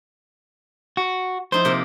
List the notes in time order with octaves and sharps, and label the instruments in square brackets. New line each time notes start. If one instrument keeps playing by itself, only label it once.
[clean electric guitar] F#4
[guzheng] F3 D#4 E4 [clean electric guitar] C5
[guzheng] C3 A#3 A#4